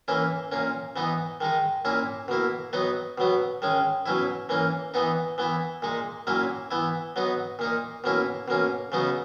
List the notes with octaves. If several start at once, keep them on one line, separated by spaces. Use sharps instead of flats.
E3 A#3 C#4 E4
A#2 A#3 C#4
E3 B3 D#4
D#3 G#3 D#4
A#2 A#3 C#4 E4
B2 A#3 E4
F#3 B3 D#4
B2 F#3 B3
D#3 G#3 C#4
B2 F#3 C#4 E4
E3 A#3 C#4
E3 B3 D#4
E3 B3 E4
A#2 G#3 D#4
A#2 F#3 A#3 C#4 E4
E3 B3 E4
F#3 B3 D#4
A#2 A#3 D#4
B2 A#3 C#4 E4
B2 A#3 C#4
C#3 F#3 B3 D#4